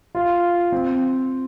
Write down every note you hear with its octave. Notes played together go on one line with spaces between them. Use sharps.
F4
C4